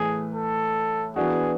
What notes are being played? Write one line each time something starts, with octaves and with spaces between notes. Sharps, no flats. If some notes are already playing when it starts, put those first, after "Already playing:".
Already playing: A2 E3 A3 G#4
A4
E3 B3 D4 F#4 G#4